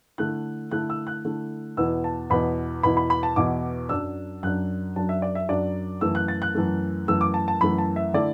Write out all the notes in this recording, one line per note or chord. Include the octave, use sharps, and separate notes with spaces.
D3 A3 E4 F#6
D3 A3 E4 F#6
E6
F#6
D3 A3 E4
E2 B2 B3 E4 E6
A5
E2 B2 B3 E4 B5
E2 B2 B3 E4 B5
B5
B5
A5
E2 B2 B3 E4 D6
F#2 F#3 D4 E6
F#2 F#3 D4 F#6
F#2 F#3 D4 A5
E5
D5
E5
F#2 F#3 D4 D5
F#2 E3 A3 E6
F#6
A6
F#6
F#2 E3 A3
F#2 E3 A3 E6
D6
A5
A5
F#2 E3 A3 B5
A5
E5
D3 A3 E4 D5